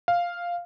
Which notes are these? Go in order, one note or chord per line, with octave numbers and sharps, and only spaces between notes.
F5